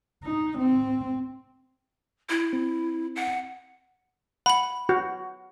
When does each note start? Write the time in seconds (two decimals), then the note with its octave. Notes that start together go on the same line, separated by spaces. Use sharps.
0.23 D#4
0.58 C4
2.30 E4
2.53 C4
3.16 F#5
4.46 F#5 B5 F#7
4.89 F#4